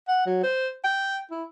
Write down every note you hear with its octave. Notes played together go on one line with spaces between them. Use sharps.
F#5
F#3
C5
G5
E4